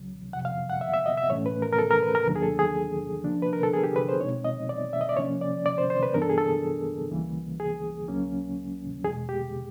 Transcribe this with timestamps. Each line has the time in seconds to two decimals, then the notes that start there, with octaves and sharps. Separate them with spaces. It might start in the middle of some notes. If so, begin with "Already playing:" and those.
Already playing: C#2 C#3 F#3
0.33 F2 C3 F3 F#5
0.45 F5
0.69 F#5
0.81 E5
0.94 E5
1.06 D#5
1.18 E5
1.30 A2 E3 A3 C#4 C#5
1.46 B4
1.62 A#4
1.73 A#4
1.78 A4
1.91 A#4
2.03 B4
2.15 A#4
2.27 D#2 D#3 F#3 A#3 D4
2.36 G#4
2.42 A4
2.59 G#4
3.24 C#3 F3 A#3 D4
3.42 B4
3.53 A#4
3.63 A4
3.74 G#4
3.84 G4
3.96 B4
4.08 C5
4.20 B2 G#3 C4 D#4 C#5
4.44 D#5
4.69 D5
4.93 E5
5.01 D#5
5.09 D5
5.17 C3 F3 A#3 C#4 C#5
5.41 D5
5.66 D5
5.78 C5
5.90 C5
6.03 B4
6.14 G2 E3 G3 B3 D4 A#4
6.22 A4
6.29 G#4
6.38 A4
7.11 C#2 C#3 E3 G3 A#3
7.60 G#4
8.08 C#2 C#3 F#3 A#3 C#4
9.04 E2 B2 G#3 G#4
9.29 G4